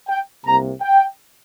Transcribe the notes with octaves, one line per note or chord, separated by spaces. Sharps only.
G5
C2 C3 A#3 A#5
G5